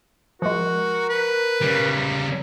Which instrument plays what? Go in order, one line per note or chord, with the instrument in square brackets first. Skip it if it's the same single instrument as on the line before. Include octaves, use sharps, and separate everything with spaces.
[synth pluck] F3 G#3 [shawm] F#4 [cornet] A#4
[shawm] B4
[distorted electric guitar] C#3 G3